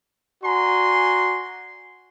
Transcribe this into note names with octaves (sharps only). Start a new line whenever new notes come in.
F#4 D5 G#5 A#5 C6